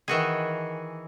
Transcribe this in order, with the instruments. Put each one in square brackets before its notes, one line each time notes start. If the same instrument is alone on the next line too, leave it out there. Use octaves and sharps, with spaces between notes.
[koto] D#3 E3 F#4 G#4